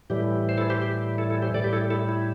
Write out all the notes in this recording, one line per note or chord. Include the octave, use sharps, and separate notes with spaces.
A2 E3 G3 G4
C5
E4 A4
G4 C5
G4
E4 A4
E4 A4
G4 C5
A2 G3 A4 D5
G4
E4 A4
E4 A4
E4